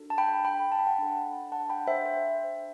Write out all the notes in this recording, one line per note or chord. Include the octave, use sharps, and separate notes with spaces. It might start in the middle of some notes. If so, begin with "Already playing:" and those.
Already playing: D4 F#4 A4
A5
G5 B5
G5 B5
A5
B5
F#5 A5
D4 A4
F#5 A5
G5 B5
C5 E5
C5